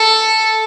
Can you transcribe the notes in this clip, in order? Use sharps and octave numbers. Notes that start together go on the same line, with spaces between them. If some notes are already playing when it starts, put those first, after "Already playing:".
Already playing: A4